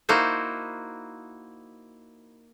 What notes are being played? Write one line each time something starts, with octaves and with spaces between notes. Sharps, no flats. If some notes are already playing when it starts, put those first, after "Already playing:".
A#3 D#4 E4 F#4 C5